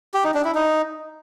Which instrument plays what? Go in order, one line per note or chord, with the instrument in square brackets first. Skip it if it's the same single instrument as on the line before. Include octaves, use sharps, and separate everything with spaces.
[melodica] G4
D#4
D4
E4
D#4